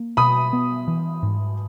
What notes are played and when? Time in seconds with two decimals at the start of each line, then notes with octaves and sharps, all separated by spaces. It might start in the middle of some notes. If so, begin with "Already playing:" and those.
Already playing: A#3
0.17 B2 B5 D#6
0.53 B3
0.88 E3
1.23 G#2